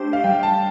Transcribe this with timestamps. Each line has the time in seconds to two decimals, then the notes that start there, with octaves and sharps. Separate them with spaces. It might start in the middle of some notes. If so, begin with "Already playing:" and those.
Already playing: A3 D4 G4 C5
0.13 F5
0.24 G3 G5
0.43 A5